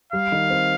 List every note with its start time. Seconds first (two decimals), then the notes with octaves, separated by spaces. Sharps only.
0.13 G3 F5
0.32 D#3
0.50 C4